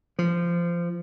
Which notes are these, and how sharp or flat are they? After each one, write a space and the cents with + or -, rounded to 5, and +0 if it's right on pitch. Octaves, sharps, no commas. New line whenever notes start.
F3 -20